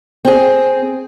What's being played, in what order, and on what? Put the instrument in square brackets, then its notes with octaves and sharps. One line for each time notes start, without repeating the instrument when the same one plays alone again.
[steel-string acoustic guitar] C4 G#4